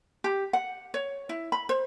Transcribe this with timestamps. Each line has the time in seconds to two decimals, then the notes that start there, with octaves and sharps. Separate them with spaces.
0.24 G4
0.53 F#5
0.94 C#5
1.29 E4
1.52 B5
1.69 C5